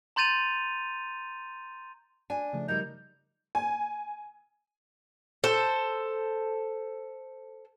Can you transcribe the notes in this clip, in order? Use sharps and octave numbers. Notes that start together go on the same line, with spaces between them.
A#5 C6 G6 A6 D#7 F7
D4 G#5
C#3 F3 A3
G3 D#4 A#4 G6
G#5
A4 C5